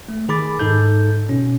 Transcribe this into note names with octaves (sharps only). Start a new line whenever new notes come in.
A3
D#3 G#4 B5 D6 A6
G#2 D#4 A4 G6
B2 C#4